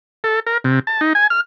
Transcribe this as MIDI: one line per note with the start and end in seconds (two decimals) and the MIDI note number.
0.24 0.40 69
0.47 0.58 70
0.64 0.79 48
0.87 1.01 81
1.01 1.13 63
1.15 1.27 80
1.30 1.41 89